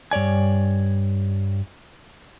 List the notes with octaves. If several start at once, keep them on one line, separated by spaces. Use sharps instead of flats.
G2 C#5 D5 G#5